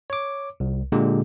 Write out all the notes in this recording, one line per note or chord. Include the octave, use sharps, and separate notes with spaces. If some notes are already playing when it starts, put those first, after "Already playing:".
C#5 D6
C2
A#2 D3 G#3 G4